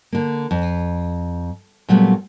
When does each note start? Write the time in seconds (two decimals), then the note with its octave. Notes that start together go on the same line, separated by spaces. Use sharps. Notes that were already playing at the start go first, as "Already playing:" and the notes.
0.12 D3 A#3
0.51 F2
1.89 A#2 F#3 G3 A3 B3